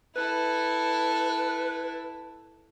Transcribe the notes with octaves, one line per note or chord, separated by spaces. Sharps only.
E4 A4 B4